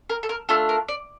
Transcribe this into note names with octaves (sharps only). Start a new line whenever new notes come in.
A#4
A4
A#4
A3 D4 F4 A4
A#4
D5